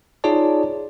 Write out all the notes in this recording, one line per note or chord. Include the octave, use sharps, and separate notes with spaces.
D#4 F4 G#4 C#5 D5 A5